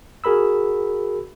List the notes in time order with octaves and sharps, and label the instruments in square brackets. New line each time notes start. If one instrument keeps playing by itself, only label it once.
[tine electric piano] F#4 G#4 A#4 B5 E6